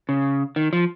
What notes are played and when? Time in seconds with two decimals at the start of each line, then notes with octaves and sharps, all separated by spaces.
0.09 C#3
0.56 D#3
0.73 F3